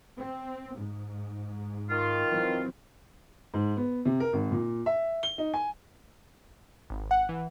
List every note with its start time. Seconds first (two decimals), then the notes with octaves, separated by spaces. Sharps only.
0.19 C4
0.76 G#2
1.90 D#3 F4
2.30 E3 F#3 C4
3.54 G#2
3.77 B3
4.05 C3
4.20 A#4
4.33 G#1
4.51 A#2
4.86 E5
5.23 G7
5.38 D#4
5.54 G#5
6.90 G#1
7.11 F#5
7.29 E3